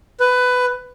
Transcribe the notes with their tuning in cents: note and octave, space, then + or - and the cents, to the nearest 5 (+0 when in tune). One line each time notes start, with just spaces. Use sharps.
B4 +15